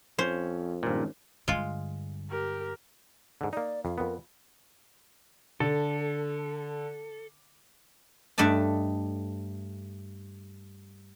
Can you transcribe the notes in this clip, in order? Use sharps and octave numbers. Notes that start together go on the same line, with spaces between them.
F2 C#4 C5
G#1 G2 A#2 F3 C#4
G2 D3 G#3 F4
G4 A#4
G#2 D3
A#3 D#4 D5
F2 F5
F2 B3 A#4
D3 A4
G2 A3 D5 D#5 A5